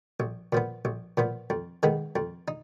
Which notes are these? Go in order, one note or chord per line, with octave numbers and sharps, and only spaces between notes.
A#1
A#2 F3 B3
A#1
A#2 F3 B3
F2
D#3 G#3 B3 D#4
F2
D#4